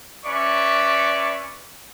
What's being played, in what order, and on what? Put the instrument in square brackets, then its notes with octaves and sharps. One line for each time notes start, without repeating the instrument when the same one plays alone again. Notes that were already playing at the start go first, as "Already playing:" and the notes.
[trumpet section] C#4 B4 D5 E5 C#6